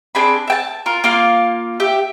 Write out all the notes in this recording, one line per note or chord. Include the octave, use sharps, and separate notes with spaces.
C4 D4 G#4 B5
E5 G5 A5
F4 A#4
A#3 F4 F5
G4 E5